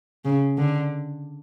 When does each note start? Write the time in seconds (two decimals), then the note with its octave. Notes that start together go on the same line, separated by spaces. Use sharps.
0.25 C#3
0.58 D3